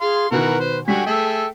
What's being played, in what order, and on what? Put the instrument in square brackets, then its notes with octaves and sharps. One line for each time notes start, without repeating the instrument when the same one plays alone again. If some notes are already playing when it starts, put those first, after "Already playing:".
[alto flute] G#4 [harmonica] F5 C6
[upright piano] B2 D#3 [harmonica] E3 F#4 A#4 [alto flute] B4
[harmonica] C5
[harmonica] D3 F#4 G#5 [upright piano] G3 B6 [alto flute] G5
[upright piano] A3 [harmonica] G#4 A4 E5